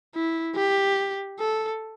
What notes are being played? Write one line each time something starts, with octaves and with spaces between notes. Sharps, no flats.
E4
G4
A4